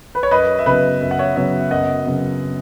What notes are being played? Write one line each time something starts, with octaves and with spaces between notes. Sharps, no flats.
B4
C#5
F#2 B4 D#5
E5
C#3 F#3 B3 B4 D#5
F#2 E5
F#5
C#5 E5
C#3 F#3 B3 C#5 E5
E5
F#2 D#5 F#5
C#3 F#3 B3